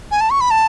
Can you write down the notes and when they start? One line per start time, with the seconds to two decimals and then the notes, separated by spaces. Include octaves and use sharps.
0.11 G#5
0.21 A5
0.30 C#6
0.41 B5
0.51 A5